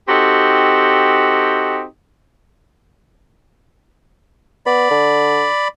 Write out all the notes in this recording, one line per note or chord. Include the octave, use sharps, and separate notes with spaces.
C4 D#4 F#4 G4 A4
B3 D5 B5
D3